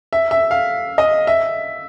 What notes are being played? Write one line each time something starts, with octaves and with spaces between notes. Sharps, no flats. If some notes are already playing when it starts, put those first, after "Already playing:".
E5
E5
F5
D#5
E5